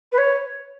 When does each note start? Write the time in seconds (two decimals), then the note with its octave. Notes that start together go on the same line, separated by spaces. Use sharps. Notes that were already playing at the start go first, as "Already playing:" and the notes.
0.12 B4
0.18 C#5